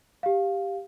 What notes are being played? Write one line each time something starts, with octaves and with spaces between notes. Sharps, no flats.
G4 F5